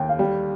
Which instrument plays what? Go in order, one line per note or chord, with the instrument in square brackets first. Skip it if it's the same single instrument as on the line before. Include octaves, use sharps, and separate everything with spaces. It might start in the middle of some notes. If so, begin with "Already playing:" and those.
Already playing: [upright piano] D#2 [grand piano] G5
[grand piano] F5
[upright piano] G3 [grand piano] G5